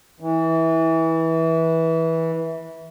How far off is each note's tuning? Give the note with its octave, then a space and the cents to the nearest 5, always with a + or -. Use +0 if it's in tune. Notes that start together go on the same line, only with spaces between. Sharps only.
E3 -20